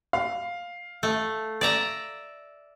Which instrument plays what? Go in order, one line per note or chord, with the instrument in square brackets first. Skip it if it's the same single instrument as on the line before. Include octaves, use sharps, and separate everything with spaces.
[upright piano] F5
[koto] A3
D5 E5 A#5